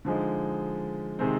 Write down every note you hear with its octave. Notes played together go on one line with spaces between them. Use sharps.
D3 F3 G#3 D#4
C3 D#3 G#3 C4